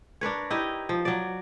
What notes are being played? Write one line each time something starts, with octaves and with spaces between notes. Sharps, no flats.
D4 A#4 B4 C#5
D#4 E4 G4 D#5
F3
F#3 D5